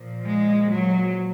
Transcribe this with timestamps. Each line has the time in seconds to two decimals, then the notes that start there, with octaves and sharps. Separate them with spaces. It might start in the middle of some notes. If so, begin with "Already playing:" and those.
Already playing: A#2 F3
0.24 G#3
0.70 F#3